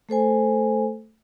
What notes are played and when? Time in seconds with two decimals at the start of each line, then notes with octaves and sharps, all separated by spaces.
0.09 A3 A4 C5 G#5